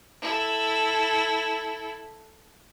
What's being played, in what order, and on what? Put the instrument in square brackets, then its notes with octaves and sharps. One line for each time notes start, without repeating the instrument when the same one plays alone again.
[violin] E4 A4